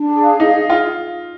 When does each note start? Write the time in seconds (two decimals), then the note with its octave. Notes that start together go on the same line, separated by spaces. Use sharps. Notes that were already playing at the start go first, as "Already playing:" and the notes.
Already playing: D4
0.09 G#4
0.24 F5
0.40 D#4 G#4
0.54 G#4
0.70 F4 G#4